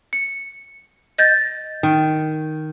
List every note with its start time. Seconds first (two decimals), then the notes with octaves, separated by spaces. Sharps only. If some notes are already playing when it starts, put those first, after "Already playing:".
0.13 C#7
1.19 D#5 G6 A6
1.83 D#3